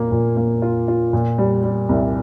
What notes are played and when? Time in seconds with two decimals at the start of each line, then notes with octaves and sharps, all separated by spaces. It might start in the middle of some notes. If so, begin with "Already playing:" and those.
Already playing: A#2 A#3
0.11 A#2
0.37 A#3
0.62 F4
0.88 F4
1.13 A#2
1.38 G3
1.63 G3
1.89 C2